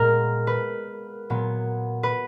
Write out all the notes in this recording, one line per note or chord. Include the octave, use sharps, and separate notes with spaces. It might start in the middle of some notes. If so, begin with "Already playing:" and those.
Already playing: A#2 G#3 B3 A#4
B4
A#2 F#3 B3
B4